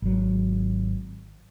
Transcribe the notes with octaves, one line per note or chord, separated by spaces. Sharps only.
G#1 F#3